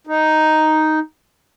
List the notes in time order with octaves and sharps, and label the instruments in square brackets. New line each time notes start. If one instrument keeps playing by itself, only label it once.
[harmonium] D#4